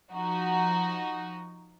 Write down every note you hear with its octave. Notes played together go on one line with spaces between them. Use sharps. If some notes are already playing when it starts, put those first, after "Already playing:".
F3 D#4 F#4